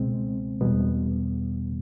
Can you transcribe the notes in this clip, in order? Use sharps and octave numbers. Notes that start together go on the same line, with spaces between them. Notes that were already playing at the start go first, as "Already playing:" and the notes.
Already playing: C#2 B2 G#3 C4
E2 B2 G3 B3